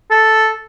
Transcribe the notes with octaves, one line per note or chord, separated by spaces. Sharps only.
A4